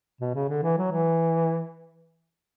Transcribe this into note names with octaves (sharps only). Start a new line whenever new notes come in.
B2
C#3
D3
E3
F#3
E3